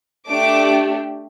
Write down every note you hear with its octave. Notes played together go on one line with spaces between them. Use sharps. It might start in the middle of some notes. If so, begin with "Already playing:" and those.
A3 D4 G4 D6